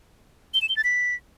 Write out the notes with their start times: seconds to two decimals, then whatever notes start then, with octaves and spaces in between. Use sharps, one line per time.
0.54 G7
0.62 E7
0.69 G7
0.77 A6
0.84 B6